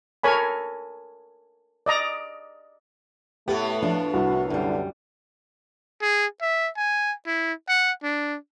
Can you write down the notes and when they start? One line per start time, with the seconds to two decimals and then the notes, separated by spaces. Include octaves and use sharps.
0.23 A4 A#4 C#5 G#5 B5
1.86 D5 D#5 A#5
3.48 A2 A3 B3 G4
3.82 F3 D4
4.14 C2 F#4
4.50 F#2 D3 G3
6.02 G#4
6.42 E5
6.77 G#5
7.27 E4
7.69 F#5
8.04 D4